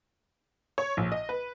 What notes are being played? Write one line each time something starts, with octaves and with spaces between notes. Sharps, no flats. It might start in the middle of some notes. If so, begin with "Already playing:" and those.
C#5
A#1
D#5
B4